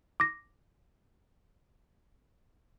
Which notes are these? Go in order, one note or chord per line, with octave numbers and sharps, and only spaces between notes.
D6 A#6